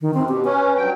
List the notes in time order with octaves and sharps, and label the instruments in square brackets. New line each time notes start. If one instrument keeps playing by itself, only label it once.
[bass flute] D#3
[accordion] F#2 [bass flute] C4
[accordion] B2 [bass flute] G4
[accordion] C#4 [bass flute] B4
[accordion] G2 F#3 G5